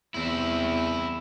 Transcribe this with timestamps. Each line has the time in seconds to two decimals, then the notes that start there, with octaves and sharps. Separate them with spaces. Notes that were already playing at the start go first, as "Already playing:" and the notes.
0.14 E2 C4 E4